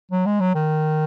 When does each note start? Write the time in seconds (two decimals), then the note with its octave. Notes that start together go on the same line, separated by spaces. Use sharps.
0.11 F#3
0.26 G#3
0.40 F#3
0.55 D#3